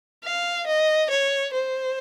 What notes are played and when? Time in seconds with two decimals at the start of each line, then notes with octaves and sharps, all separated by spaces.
0.24 F5
0.67 D#5
1.10 C#5
1.53 C5